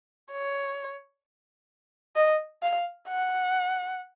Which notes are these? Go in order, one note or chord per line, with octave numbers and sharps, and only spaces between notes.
C#5
D#5
F5
F#5